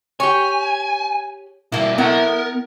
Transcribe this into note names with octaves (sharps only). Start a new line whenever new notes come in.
G4 C#5 G#5
B2 G3 A#3 E4
B3 E4 A#4 F#5 A#5